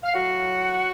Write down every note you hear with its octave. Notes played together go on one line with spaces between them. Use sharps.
F5
A2 F#3 F#4 F#5